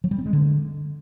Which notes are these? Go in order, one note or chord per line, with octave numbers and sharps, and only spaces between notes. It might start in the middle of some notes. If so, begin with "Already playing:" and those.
F#3
G3
C4
G#3
D3